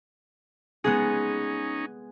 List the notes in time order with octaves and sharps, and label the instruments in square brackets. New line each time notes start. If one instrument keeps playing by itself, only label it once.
[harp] G#3 B3 G#4 [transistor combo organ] C#4 D#4